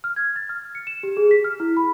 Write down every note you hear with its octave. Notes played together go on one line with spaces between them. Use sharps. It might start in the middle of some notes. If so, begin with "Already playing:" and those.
F6
G#6
A6
F6
C#7
E7
G4
G#4
B6
F6
E4
B5